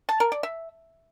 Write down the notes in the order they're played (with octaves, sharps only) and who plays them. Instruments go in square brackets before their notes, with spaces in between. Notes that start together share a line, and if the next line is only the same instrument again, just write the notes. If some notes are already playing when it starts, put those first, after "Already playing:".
[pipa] A5
A#4
D5
E5